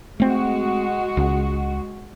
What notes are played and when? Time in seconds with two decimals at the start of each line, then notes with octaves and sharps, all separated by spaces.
0.20 G#3 A3 C4 F#4
1.17 C#2